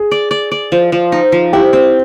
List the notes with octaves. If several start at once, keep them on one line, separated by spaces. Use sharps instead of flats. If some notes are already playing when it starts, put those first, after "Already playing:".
Already playing: G#4
D5
D5
D5
F3
F3
D#4
F3
E4 G4
C4